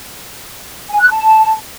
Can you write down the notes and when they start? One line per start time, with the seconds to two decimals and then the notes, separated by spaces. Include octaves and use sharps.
0.90 G#5
1.00 F#6
1.10 A5